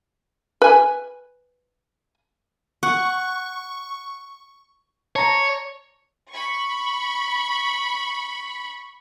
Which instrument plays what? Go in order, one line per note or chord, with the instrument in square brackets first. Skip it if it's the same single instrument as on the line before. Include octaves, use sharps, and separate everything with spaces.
[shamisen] B4 G#5
[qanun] F#5 [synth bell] C#6
[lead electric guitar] C#5 [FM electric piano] A5 A#5
[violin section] B5 C#6